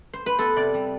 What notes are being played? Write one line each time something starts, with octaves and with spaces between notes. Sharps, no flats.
C5
B4
B3 A4
C3 D5
G3